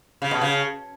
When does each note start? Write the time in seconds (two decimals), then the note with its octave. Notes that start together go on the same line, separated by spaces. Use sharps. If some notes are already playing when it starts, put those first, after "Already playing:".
0.22 C#3
0.31 B2
0.41 C#3